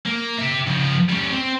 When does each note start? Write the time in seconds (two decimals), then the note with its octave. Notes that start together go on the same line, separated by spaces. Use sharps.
0.06 A#3
0.38 G4 E5
0.67 C#3 F3
1.09 G3 C#4
1.32 C4